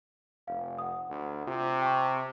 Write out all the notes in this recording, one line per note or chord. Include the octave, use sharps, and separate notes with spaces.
F1 F5
F#5 D#6
D2
C3 F4
G5 A5 C#6